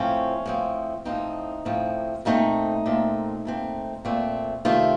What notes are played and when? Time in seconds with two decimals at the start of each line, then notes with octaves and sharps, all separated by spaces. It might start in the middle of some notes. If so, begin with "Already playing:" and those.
Already playing: A2 F3 C4 C#4
0.46 A2 F3 C4
1.05 A2 F3 C4 D#4
1.65 A2 F3 C4
2.25 A#2 A3 C4 D#4
2.86 A#2 A3 C4
3.45 A#2 A3 C4
4.05 A#2 A3 C4
4.65 C3 D#3 A3 C4 F4